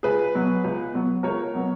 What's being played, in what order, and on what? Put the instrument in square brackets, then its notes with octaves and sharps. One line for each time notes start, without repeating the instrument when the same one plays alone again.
[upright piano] C#2 G#4 B4
B2 F#3 B3
C#2
B2 F#3 B3
C#2 A#4 C#5
B2 F#3 B3